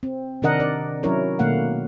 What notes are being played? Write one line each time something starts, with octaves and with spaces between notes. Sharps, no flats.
C4
C3 D#3 D4 A#4 D#5 F#5
D5
F#3 C#4 E4 A#4 C#5
B2 D#3 A3 A#3 F5 F#5